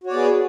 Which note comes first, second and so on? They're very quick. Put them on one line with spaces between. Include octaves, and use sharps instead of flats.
F#4 C#5 D5 B3 G#4